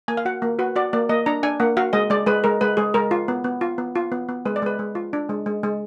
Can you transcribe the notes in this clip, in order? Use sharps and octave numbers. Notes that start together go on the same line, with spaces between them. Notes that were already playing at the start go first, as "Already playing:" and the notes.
A#3 G#5
F5
F#4 F#5
A#3
F#4 B4
F#4 D5
A#3 D5
A#3 D#5
D4 A#5
D4 G#5
A#3 F#5
F#4 F5
G#3 D#5
G#3 D5
G#3 B4
G#3 A#4
G#3 B4
G#3 G#4
G#3 A#4
F4
B3
B3
F4
B3
F4
B3
B3
G#3 B4
D5
G#3 B4
G#3
F4
D4
G#3
G#3
G#3